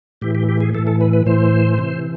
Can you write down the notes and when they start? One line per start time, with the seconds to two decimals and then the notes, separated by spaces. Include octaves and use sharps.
0.21 A2 E3 G4
0.35 G4
0.49 G4
0.61 G#4
0.75 E3 A4
0.79 A2
0.87 A4
1.01 B4
1.13 B4
1.26 A2 E3 C5
1.78 C3 E3